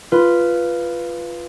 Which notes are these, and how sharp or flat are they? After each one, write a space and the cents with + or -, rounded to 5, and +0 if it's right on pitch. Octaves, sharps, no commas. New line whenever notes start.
F4 -10 B4 +0